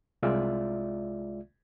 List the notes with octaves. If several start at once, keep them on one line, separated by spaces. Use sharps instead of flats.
C2 G#3 F4 D5 E5